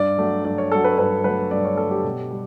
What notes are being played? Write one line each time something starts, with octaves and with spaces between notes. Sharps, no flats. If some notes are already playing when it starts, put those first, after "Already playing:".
Already playing: G2 D5
F#3 A3
G2 D5
C#5
F#3 A3 A4
B4
G2 B4
F#3 A3 B4
G2 D5
C#5
F#3 A3 A4
G4
B2
G3